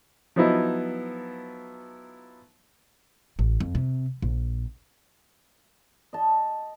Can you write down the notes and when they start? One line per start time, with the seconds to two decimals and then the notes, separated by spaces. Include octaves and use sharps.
0.36 F3 F#3 B3 D#4 E4
3.39 A1
3.60 F2
3.75 C3
4.22 A#1
6.13 D#5 A5